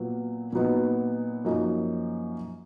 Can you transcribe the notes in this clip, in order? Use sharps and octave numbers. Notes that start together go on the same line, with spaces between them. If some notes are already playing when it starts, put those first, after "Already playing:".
Already playing: A#2 F#3 B3 F4
A#2 F#3 B3 D#4
F#2 F3 A#3 D#4 F#4